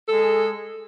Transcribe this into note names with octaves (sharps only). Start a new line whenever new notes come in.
G#3 G#4 A4